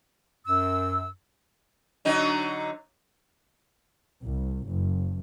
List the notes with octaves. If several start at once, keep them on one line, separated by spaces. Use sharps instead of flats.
F#2 E6
D3 F#3 D#4
C2
F#1